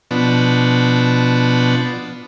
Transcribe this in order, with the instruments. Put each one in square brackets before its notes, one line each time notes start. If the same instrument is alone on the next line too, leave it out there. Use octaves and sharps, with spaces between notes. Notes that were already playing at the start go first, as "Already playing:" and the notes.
[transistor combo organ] B2 F3 B3 D4